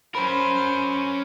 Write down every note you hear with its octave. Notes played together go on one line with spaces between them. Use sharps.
C#4 A#4 C5 B5